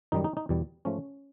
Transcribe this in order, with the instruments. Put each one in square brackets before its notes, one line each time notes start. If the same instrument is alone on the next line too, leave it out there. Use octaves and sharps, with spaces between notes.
[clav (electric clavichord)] F#2 D#3 G3 D#4
D#4
D#4
E2 B2 G3
G#2 F3 A3 C#4